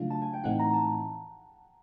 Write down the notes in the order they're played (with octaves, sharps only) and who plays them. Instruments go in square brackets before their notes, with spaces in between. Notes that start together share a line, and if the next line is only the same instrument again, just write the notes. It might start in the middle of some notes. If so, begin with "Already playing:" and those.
Already playing: [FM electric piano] C#3 F#3 A3 D4 F4 [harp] F5
[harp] A5
G#5
G5
[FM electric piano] A2 E3 A3 C4 D#4 [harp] F#5
[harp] A#5
A5